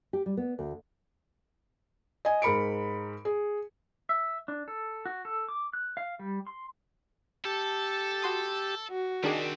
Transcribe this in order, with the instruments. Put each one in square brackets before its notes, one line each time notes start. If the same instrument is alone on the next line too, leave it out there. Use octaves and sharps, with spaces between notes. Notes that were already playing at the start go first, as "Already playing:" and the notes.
[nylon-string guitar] G4
G3
B3
D2
[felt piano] D#5 G#5
G#2 A#4 B5 C#7 D7
G#4
[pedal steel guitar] E5
D4
A4
F#4
A4
D6
F#6
F5
G3
C6
[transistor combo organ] G4 A5 [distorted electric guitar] A4
[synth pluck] F#4 C6 D#6
[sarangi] F#4
[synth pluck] D#3 D4 G#4 [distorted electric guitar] G3 C4